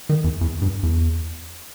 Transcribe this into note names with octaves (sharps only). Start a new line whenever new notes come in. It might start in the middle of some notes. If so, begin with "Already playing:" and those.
D#3
E2
E2
G2
E2